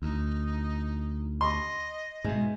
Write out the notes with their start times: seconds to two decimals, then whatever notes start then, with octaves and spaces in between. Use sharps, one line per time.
0.02 D2 D#4
1.41 D#5 C6
2.24 G#2 B2 G#3